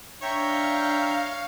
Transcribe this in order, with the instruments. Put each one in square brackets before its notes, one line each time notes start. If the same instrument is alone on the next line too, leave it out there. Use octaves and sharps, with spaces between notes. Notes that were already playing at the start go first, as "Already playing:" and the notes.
[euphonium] D4 [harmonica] C#5 [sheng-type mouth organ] E5 G5 A#5 [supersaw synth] F5